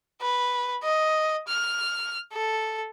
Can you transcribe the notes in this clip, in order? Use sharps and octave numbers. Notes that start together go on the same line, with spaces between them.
B4
D#5
F6
A4